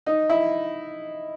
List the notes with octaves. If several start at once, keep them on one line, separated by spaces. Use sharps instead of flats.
D#4
E4